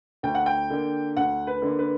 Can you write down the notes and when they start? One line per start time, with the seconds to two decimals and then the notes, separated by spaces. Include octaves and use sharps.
0.23 D2 G5
0.35 F#5
0.46 G5
0.70 D3 A#3
1.17 D2 F#5
1.47 B4
1.62 D3 A#3
1.79 B4